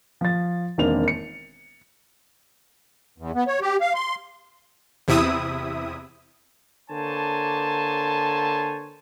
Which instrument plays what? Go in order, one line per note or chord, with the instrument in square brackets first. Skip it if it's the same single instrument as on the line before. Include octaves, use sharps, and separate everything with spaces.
[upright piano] F3 A6
E1 D#3 A#3 C4 D4 F7
C#7
[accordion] E2
B3
C#5
G4
F5
C6
[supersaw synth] E2 C3 E4 E5 D#6
[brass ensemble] D3 A#3 C5 C#5 G#5 A5